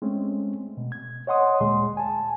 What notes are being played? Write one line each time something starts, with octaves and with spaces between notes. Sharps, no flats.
G#3 A3 C4 C#4
B2
G#6
C#5 D#5 F#5 C6 D#6
D2 A#2 G#3 C6
G#5 A5